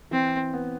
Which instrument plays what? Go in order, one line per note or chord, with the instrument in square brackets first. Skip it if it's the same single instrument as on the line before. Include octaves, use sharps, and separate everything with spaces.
[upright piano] E3 [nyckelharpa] C4
[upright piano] B3